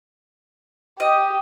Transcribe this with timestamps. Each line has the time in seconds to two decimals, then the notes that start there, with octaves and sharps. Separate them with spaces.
1.00 G4 D#5